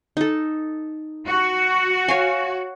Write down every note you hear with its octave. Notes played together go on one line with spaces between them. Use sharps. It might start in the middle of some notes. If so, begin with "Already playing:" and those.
D#4 A4
F#4
C#5 F5 G#5